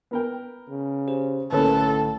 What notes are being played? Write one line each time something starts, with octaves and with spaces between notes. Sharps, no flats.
B3 A#4 G5
C#3
G4 G#4 C5
B1 A2 D3 A#3 C#4 A4 B4